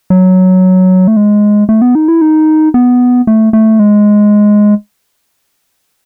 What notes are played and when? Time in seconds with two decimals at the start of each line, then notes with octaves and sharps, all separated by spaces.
0.10 F#3
1.07 A3
1.17 G#3
1.69 A3
1.82 B3
1.95 D#4
2.08 E4
2.21 D#4
2.74 B3
3.27 A3
3.53 A3
3.79 G#3